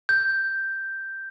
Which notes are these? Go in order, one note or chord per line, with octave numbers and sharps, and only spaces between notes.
G6